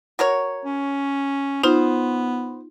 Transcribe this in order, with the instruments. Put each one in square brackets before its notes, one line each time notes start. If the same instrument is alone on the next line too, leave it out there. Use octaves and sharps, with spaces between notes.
[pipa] F#4 A#4 C#5
[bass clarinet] C#4
[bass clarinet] B3 [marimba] D#4 F4 [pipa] C5